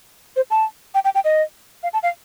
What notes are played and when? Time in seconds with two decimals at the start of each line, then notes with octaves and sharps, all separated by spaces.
0.36 C5
0.50 A5
0.95 G5
1.05 G5
1.15 G5
1.25 D#5
1.83 F5
1.93 A5
2.03 F5